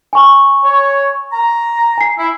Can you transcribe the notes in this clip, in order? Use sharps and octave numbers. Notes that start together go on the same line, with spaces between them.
G#5 C#6
C#5
A#5
G#5 C7
E4